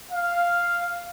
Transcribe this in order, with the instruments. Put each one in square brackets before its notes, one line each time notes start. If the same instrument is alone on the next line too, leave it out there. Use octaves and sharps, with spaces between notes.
[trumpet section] F5